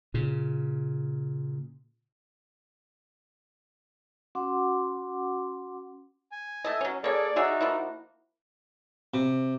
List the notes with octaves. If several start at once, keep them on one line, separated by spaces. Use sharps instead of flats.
A#2 C#3
C#4 F#4 F#5 C6 D6
G#5
A3 A4 D#5
F#3 C#4
A#3 G#4 A4 C#5 D5
D#4 F#4 G#4 C#5 E5
F3 A#3 E4
C3